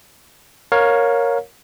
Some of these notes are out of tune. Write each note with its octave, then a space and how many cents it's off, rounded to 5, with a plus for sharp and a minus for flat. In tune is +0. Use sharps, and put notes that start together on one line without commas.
A#4 +0 C#5 +0 F5 +25